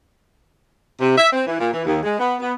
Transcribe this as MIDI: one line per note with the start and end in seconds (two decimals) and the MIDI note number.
1.00 1.15 48
1.17 1.27 76
1.32 1.43 60
1.47 1.59 52
1.59 1.71 46
1.73 1.84 52
1.86 2.02 39
2.04 2.17 56
2.19 2.36 59
2.40 2.53 59